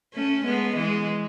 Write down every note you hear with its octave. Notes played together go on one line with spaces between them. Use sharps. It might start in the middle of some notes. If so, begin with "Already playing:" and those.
A3 C#4
G#3 B3
E3 G#3